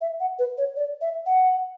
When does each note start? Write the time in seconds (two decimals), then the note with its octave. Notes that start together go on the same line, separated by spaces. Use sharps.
0.01 E5
0.20 F#5
0.39 B4
0.58 C#5
0.76 D5
1.01 E5
1.26 F#5